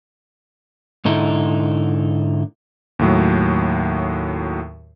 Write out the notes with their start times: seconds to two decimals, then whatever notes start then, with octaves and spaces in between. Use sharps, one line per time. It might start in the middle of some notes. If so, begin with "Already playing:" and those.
1.05 G#2 D3 D#4 E4
2.99 D#2 A2 F#3